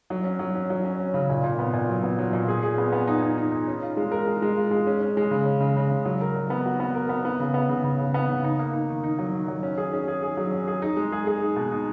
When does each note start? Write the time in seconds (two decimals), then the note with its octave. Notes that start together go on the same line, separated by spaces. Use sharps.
0.10 F#3
0.24 C#4
0.39 F#3
0.55 C#4
0.70 F#3
0.85 C#4
0.99 C#4
1.14 C#3
1.30 A#2
1.44 A#2
1.59 B3
1.73 A#2
1.89 F#3
2.03 B3
2.19 F#3
2.33 A#2
2.48 G#4
2.63 G#4
2.78 B3
2.92 B3
3.07 D#4
3.22 D#4
3.37 D#4
3.52 D#4
3.67 C#4
3.82 F4
3.97 G#3
4.12 A#4
4.27 G#3
4.42 G#3
4.57 F4
4.71 G#3
4.87 C#4
5.01 C#4
5.17 G#3
5.31 C#3
5.46 C#4
5.61 C#3
5.76 C#3
5.91 C#3
6.05 F#3
6.21 A#4
6.36 F#3
6.50 B3
6.66 F#4
6.80 B3
6.95 A#4
7.09 B3
7.25 B3
7.40 C#3
7.54 B3
7.69 C#3
7.84 C#3
7.99 C#3
8.14 B3
8.29 C#3
8.44 D#4
8.59 A#3
8.73 D#4
8.89 D#3
9.04 D#4
9.19 F#3
9.34 D#3
9.48 F#3
9.63 C#4
9.78 G#4
9.93 C#4
10.08 G#4
10.23 G#4
10.37 F#3
10.52 C#4
10.68 G#4
10.82 D#4
10.97 G#3
11.12 G#4
11.27 G#4
11.42 D#4
11.56 B2
11.72 D#4